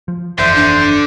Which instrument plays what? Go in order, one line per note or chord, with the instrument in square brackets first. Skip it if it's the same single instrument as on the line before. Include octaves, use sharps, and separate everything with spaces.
[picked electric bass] F3
[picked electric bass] G1 F2 E3 [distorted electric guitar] D3 [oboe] C5 [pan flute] E5
[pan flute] D4